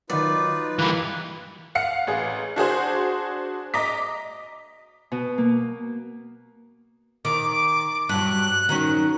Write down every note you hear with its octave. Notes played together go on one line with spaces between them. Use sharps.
D#3 F#3 D#4 F4 B4 D5
E3 G3 A#3 B4 B5 F#6
F5 F#5 C#7
A1 G#4
D4 F#4 G#4 C5
D#5 A#5 D6 B6
B2
A#3
D#3 D6
G2 F#3 F#6
D#3 F#3 C#4